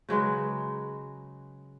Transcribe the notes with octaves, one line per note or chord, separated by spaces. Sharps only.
C#3 F#3 G#3 B4